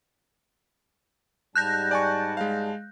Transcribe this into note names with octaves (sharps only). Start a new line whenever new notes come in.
G#2 G3 A5 F#6 G6 A#6
D5 G#5 C#6
G#3 F5